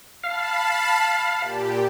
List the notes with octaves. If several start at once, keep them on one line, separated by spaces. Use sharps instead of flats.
F5 A5 B5
A#2 G4